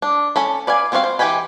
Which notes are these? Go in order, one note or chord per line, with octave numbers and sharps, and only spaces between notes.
D4
C#4 A4 B5
B4 D5 F5 G#5
B3 C4 F4 F#4 F5
C5
E3 G4 G5 G#5 B5